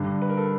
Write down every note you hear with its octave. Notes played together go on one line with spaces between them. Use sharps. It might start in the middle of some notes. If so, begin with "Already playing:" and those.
Already playing: G2 D3
B4
A#4
A4